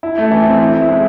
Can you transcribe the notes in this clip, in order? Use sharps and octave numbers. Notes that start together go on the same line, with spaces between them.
E4
A3
E3
C4
E4
E4
G#3